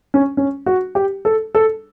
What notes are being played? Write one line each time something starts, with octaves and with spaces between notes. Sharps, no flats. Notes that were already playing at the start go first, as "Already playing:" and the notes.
C#4
C#4
F#4
G4
A4
A4